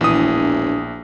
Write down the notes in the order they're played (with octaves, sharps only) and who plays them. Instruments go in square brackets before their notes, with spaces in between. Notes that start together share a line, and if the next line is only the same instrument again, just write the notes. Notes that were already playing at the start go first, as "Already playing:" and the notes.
[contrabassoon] E1 [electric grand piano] A#1 D#6 [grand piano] E3